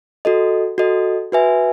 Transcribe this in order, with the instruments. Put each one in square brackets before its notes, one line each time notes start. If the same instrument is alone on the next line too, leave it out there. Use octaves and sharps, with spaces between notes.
[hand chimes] F#4 A4 D#5
F#4 A4 D#5
F#4 B4 E5 G#5